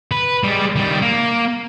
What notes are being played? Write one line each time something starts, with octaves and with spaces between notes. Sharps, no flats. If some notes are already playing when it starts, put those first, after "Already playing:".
B4
G3 G#3
D#3 G3
A#3